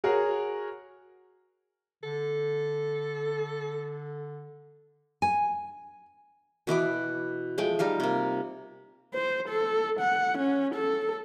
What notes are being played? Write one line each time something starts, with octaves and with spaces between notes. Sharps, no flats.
F#4 G#4 A#4 C#5 F#5
D3 A4
G#5
B2 E3 B3 D6
F3 G#3 A3 G5
G3 D#4 F4 F5
C3 A#3
C5
A4
F#5
C#4
A4